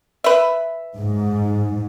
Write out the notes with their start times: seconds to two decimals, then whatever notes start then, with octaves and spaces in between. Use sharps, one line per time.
0.24 B4 E5
0.98 G#2